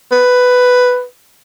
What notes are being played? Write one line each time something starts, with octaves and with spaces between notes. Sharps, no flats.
B4